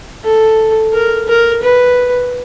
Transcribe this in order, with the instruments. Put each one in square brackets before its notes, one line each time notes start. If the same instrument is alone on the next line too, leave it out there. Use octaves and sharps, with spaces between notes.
[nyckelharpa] A4
A#4
A#4
B4